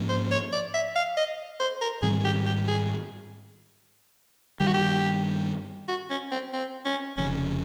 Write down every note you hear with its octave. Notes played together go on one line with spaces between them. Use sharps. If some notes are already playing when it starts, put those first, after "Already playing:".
Already playing: G#2 F3 A#3 C#4
C5
C#5
D5
E5
F5
D#5
C5
A#4
G#2 D#3 G3 C4 G#4
G4
G4
G#4
G2 D#3 G3 G4
F#4
G4
F#4
C#4
C4
C4
C#4
F1 F2 C#3 C#4